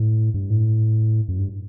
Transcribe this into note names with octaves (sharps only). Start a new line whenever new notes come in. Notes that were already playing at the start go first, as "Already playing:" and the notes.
Already playing: A2
G2
A2
F#2
G2